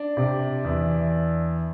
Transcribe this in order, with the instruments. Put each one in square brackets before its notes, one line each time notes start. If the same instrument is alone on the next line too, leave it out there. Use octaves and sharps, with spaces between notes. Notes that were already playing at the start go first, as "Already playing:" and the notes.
Already playing: [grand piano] D4
C3
E2